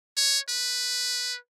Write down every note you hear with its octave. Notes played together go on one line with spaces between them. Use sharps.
C#5
B4